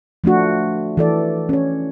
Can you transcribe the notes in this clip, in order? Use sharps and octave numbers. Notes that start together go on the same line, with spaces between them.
F3 A3 D4 F#4
E3 A4 D5
C#4 C#5